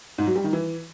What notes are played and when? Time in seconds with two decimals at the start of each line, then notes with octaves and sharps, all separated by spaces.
0.18 G#2
0.27 F#3
0.36 G3
0.44 D#3
0.53 E3